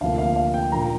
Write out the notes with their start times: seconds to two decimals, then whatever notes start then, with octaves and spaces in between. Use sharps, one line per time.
0.01 D2 C3 F3 A#3 F5
0.18 F5
0.36 F5
0.54 G5
0.72 A#2 F3 A#3 D4 A#5